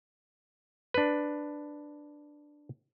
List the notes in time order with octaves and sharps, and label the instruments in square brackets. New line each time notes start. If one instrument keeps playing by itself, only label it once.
[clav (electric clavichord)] D4 B4